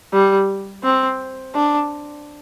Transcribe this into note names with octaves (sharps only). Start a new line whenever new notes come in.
G3
C4
D4